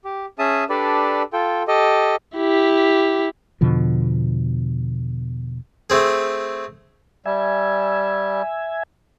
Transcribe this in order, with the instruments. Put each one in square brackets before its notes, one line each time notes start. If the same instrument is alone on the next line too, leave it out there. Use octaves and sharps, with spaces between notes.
[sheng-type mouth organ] G4
C#4 G#4 E5 A5 D#6
D4 G4 A4 B4 D5
F4 A4 G5
G4 A4 D#5
[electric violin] E4 G4
[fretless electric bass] E2 B2 D3 F3
[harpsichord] A3 C4 G#4
[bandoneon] G3 [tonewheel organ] E5 G#5